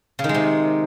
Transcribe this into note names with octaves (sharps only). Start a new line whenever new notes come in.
C#3
D#3
G#3
C3